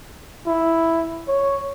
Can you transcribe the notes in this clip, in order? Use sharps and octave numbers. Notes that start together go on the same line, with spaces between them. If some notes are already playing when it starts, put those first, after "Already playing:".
E4
C#5